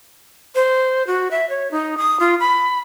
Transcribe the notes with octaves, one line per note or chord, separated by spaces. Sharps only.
C5
F#4
E5
C#5
D#4
D#6
F4
B5